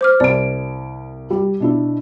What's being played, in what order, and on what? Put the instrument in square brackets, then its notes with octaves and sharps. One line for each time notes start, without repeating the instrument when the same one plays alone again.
[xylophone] C5 D6 F6
[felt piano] C2 D7 [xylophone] D5
[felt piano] G3
B2 D4 E4